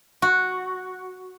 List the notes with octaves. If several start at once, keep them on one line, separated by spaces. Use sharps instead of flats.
F#4